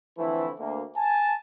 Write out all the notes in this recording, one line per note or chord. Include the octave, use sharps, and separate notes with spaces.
D3 E3 F3 A3 C4 E4
D2 A#3
G#5 A5